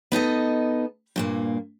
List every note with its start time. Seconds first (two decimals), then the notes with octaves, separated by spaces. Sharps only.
0.12 B3 D#4 A4 D#5
1.16 G2 A#2 A#3